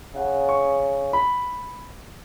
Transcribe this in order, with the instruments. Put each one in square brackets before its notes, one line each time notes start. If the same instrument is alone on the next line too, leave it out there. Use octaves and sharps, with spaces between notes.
[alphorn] C#3 [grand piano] F#5
[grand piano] C#6
B5